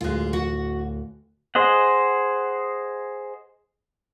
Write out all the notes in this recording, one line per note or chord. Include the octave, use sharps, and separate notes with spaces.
D1 G#3 F4 F#6
F#4 F#5
G#4 C5 D#5 F#5